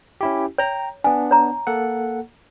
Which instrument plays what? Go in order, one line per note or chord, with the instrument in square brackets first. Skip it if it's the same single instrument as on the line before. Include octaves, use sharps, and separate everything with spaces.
[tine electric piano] C#4 E4 G4
[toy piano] C#5 [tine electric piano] G5 A#5
[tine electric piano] B3 D4 [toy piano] G#5
[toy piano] C#5 A#5
[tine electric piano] A#3 A4 F#5